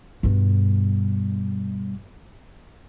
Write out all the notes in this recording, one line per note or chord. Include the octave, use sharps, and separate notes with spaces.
G2 B2